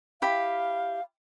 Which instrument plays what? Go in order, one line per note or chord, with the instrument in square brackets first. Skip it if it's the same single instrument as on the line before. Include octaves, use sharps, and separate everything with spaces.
[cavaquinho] E4 G4 B5 [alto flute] F5